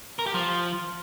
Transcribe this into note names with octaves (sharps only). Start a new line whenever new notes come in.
A#4
G4
F3